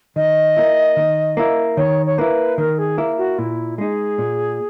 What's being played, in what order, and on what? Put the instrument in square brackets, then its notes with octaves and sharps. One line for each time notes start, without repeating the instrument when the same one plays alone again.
[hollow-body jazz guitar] D#3 [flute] D#5
[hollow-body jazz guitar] A#3 E4
D#3
A#3 E4
[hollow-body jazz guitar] D#3 [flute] C#5
[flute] C#5
[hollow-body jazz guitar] A#3 E4 [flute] B4
[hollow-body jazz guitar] D#3 [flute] A#4
[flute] G#4
[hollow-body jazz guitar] A#3 E4
[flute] F#4
[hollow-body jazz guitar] A#2 [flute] E4
[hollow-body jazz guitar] G#3 D#4 [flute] G#4
[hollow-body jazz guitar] A#2